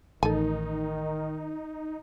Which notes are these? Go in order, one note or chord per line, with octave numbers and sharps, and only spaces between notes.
A1 D#3 D#4 A4 G#5